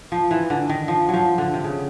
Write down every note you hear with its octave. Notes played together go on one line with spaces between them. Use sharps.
F3
E3
D3
D#3
F3
F3 F#3
D3
C3
C#3